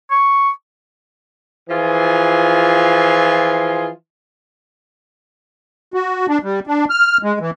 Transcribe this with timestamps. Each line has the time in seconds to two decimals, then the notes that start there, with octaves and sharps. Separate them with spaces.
0.11 C#6
1.69 E3 F3 F4 G#4
5.94 F#4
6.28 D4
6.43 G3
6.67 D4
6.90 F6
7.23 G#3
7.40 E3